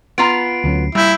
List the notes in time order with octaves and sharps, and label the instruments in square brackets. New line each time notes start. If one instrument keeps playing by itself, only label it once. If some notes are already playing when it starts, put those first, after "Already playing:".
[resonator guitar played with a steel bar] B3 F4 A#5 [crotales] C7 D7
[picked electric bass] D2 F#3 C#4
[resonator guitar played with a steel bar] A#2 [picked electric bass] G3 [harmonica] E4 [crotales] E6 G6